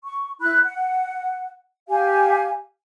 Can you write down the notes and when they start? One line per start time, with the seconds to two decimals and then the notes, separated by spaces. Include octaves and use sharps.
0.04 C#6
0.41 E4 B5 F#6
0.64 F#5
1.89 G4 F5 G#5